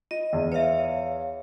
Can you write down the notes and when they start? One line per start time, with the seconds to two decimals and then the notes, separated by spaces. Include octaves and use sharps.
0.11 F4 D#5
0.33 E2
0.52 B4 C#5 E5 F5